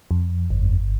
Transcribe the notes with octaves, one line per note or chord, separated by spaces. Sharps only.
F2
G1